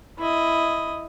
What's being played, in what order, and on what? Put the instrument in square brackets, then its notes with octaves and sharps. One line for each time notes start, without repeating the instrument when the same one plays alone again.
[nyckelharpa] E4 D#5